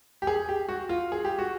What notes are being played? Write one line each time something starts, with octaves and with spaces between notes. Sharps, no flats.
G4
G#4
G4
F#4
F4
G#4
G4
F#4